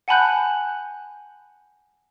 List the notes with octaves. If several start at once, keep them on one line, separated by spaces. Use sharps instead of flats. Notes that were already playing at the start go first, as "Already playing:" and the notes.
F#5 G#5 A5 B5 F#6 G6